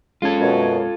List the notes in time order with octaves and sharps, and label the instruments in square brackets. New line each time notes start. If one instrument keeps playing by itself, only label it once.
[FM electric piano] G#3 C#4 G#6 [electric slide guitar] F4 A4
[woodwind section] F#2 B2